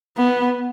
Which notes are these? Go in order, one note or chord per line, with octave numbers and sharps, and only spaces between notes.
B3